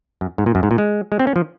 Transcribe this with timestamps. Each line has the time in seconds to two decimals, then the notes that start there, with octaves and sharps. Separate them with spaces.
0.21 F#2
0.38 G#2
0.46 A#2
0.55 F#2
0.63 G#2
0.71 A#2
0.78 G#3
1.12 G#3
1.19 C4
1.27 C#4
1.36 F3